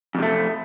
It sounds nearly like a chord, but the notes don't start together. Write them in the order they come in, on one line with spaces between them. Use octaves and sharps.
F2 C3 A3